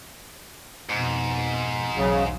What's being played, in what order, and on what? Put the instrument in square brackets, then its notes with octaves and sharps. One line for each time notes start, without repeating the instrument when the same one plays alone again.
[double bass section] F2 B2 [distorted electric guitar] G#2
[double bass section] B1 E2 F#3 [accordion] C#3